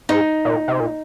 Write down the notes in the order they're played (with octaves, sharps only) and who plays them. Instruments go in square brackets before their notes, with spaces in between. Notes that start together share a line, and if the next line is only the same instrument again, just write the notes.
[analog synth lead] G#2 [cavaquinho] D#4
[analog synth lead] A#2
C3
A#2